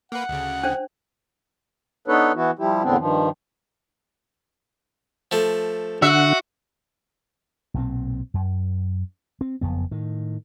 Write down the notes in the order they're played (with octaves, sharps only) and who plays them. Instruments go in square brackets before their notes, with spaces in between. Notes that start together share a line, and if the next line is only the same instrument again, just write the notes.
[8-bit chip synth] A#3 B4 [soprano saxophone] F#5
[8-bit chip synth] D2 C#3
[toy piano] C#4 D4 C5
[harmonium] B3 D4 D#4 A4 B4 C#5
E3 B3 E4 F#4
F3 G3 E4 G4
E2 A2 D3 B3 C4 D4
G2 D#3 F3
[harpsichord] F3 A3
[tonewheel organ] D3 F#5 [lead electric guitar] F#4 [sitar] E5
[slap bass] B1 A#2 C4
F#2
C4
F#1 F2 B3
A2 D#3